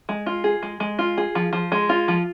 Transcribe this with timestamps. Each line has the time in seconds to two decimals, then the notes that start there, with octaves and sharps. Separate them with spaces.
0.09 G#3
0.26 F4
0.44 G#4
0.63 G#3
0.80 G#3
0.99 F4
1.18 G#4
1.35 F3
1.53 F3
1.72 G#3
1.89 F4
2.08 F3